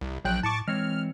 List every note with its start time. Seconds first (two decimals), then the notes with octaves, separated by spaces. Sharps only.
0.01 C2
0.25 A#1 F#3 G5 F#6
0.43 A2 A5 C#6 D6
0.68 E3 G#3 C4 C#5 F6